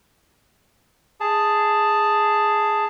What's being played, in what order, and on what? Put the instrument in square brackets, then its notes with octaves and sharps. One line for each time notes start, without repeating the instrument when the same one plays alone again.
[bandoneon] G#4 A5